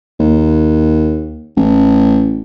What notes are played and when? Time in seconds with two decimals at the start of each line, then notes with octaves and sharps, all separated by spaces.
0.20 D#2
1.57 A1